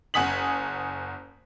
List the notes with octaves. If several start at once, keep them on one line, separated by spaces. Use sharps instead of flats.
F#1 F#5 G#5 D#6 B6 F#7